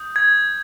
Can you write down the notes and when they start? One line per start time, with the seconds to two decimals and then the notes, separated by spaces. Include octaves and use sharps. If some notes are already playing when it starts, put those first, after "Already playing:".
Already playing: D#6 G6
0.16 G#6